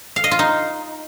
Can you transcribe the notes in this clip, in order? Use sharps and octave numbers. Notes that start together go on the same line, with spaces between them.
F5
D#5
F4
D#4